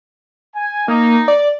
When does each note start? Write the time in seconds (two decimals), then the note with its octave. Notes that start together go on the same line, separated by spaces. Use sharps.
0.55 G#5
0.88 A#3 D#4
1.28 D5